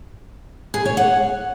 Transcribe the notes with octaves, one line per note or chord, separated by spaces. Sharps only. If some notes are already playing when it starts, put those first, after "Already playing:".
G#4
C#5
F#5